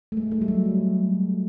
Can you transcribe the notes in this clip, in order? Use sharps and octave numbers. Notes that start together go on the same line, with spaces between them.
A3
G#3
A3
G3
F#3